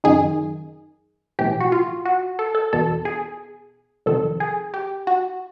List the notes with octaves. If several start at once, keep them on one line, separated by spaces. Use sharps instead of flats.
G1 F#2 D#3 G#4
B1 A2 E3 G4
F#4
F4
F#4
A4
A4
E2 B2 A4
G#4
F2 C3 D#3 A4
G#4
G4
F#4